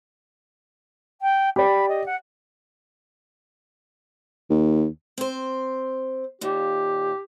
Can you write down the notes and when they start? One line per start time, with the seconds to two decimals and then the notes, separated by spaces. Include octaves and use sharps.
1.21 G5
1.56 G4 D5 B5
1.88 D#5
2.06 F#5
4.50 D#2
5.18 C4 C5
6.41 D#2 A#2 G4